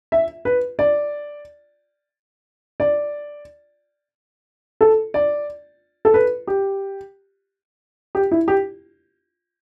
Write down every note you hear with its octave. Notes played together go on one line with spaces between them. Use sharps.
E5
B4
D5
D5
A4
D5
A4
B4
G4
G4
E4
G4